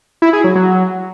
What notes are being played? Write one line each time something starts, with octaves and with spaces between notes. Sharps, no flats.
E4
G#4
F#3
F#3